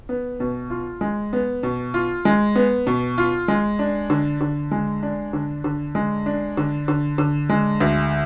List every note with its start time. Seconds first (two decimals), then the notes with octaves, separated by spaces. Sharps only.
0.09 B3
0.40 B2
0.70 F4
1.01 G#3
1.33 B3
1.63 B2
1.94 F4
2.25 G#3
2.56 B3
2.87 B2
3.18 F4
3.48 G#3
3.79 D4
4.10 D3
4.41 D3
4.71 G#3
5.03 D4
5.33 D3
5.64 D3
5.95 G#3
6.26 D4
6.57 D3
6.88 D3
7.18 D3
7.49 G#3
7.81 D2